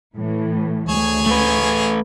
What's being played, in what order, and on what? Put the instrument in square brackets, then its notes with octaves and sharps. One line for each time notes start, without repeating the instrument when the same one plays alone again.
[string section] A2 E3
[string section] D2 [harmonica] G#4 C#5
[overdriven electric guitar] A3 B4